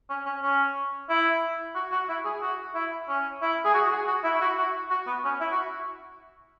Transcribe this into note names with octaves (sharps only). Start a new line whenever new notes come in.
C#4
C#4
C#4
E4
F#4
F#4
E4
G#4
F#4
E4
C#4
E4
G#4
F#4
F#4
G#4
F#4
E4
E4
F#4
F#4
F#4
B3
C#4
E4
F#4